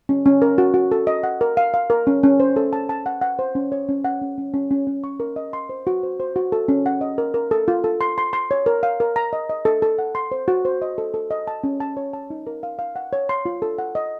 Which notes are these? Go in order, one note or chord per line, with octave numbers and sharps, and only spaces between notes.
C#4
C#4
A#4
F#4
F#4
A4
D#5
F#5
A#4
F5
F5
A#4
C#4
C#4
C5
A4
A5
A5
F#5
F#5
C5
C#4
C#5
C#4
F#5
C#4
C#4
C#4
C#4
C#4
C#6
A#4
D#5
C6
C5
F#4
C5
C5
F#4
A4
C#4
F#5
D#5
A#4
A#4
A4
F4
A4
C6
C6
C6
C#5
A#4
F5
A#4
A#5
D#5
D#5
A4
A4
F#5
C6
C5
F#4
C5
D#5
A4
A4
D#5
A5
C#4
A5
C#5
A5
D#4
A#4
F5
F5
F#5
C#5
C6
F4
A4
F#5
D#5